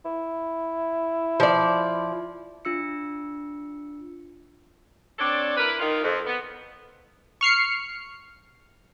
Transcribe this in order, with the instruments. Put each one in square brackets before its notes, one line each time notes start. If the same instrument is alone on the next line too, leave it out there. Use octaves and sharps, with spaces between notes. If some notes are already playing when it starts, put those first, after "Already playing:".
[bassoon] E4
[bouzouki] F3 D5
[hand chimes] D4 F4 E6 C#7
[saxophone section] C4 D4 A4 C#5 D5
E4 A#4 B4
D#3 F4
F2
B3
[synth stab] C#6 F6 C7 C#7